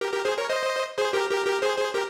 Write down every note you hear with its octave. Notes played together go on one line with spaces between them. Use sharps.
G4 A#4
G4 A#4
G#4 C5
A#4 C#5
C5 D#5
G#4 C5
G4 A#4
G4 A#4
G4 A#4
G#4 C5
G#4 C5
G4 A#4